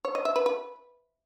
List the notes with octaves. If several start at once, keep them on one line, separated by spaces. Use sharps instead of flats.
C#5
D#5
E5
B4
B4